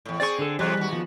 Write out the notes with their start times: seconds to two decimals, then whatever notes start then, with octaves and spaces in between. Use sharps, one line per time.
0.06 E2 A2
0.20 C4 G#4 D5 C#6
0.39 D3 A4
0.59 E2 C3 F#3 G3 G4 F#6
0.77 D#2 F#4
0.93 F3 B3